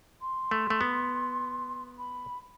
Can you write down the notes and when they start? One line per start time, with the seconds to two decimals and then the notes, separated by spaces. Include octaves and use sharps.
0.21 C6
0.51 A3
0.70 A3
0.81 B3
1.98 B5